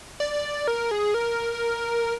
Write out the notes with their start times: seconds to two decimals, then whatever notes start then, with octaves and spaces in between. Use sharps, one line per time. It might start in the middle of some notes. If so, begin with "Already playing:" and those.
0.20 D5
0.68 A#4
0.91 G#4
1.14 A#4